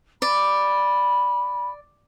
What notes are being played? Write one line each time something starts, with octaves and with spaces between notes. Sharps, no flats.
D5 B5